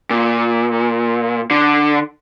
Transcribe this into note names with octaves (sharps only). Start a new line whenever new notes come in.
A#2
D3